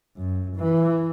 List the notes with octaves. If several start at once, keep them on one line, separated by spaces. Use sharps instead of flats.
F#2
E3